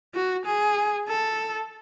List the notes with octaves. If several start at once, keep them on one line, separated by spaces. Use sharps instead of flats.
F#4
G#4
A4